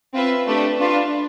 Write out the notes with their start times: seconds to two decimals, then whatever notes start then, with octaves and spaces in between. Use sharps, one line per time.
0.13 C4 F4 B4 E5
0.46 A3 D4 G4 B4
0.79 D4 F4 B4